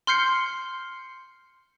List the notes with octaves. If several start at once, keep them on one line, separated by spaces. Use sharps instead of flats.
C6 F6 G6 C7 C#7